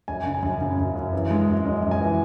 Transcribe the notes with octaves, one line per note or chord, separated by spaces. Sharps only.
F#2 G#5
C#3
G#5
F#2
C#3
F#2
F#2
E3
G#3
F#2
F#2 D#5
F#2
G#5
E3